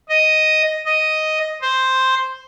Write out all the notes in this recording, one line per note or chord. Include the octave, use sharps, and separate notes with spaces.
D#5
D#5
C5